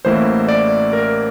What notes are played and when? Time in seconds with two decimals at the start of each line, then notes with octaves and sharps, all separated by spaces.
0.05 A1 A2 E3 A#3 C5
0.49 D5
0.93 A#4